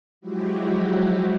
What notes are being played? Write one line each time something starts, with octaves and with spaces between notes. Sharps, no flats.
F3 F#3 G#3 E4 F#4 G4